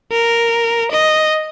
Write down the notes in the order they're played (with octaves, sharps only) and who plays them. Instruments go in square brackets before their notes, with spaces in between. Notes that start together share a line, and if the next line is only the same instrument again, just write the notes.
[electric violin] A#4
D#5